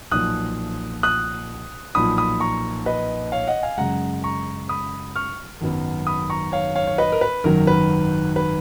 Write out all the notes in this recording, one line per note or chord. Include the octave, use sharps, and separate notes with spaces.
B1 A#2 F3 D#6 F#6
D#6 F#6
B1 A#2 F3 B5 D#6
B5 D#6
A#5 C#6
B4 D#5
C#5 F5
D#5 F#5
F5 G#5
F#2 C#3 G#3 F#5 A#5
A#5 C#6
B5 D#6
C#6 F6
G#1 F#2 D#3 F#3 B3
B5 D#6
A#5 C#6
C#5 F5
C#5 F5
C#5
B4 D#5
A#4
B4
G#1 F#2 D#3 F#3 A#4
B4
B4